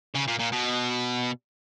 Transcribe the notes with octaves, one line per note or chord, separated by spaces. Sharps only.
C#3
A#2
A#2
B2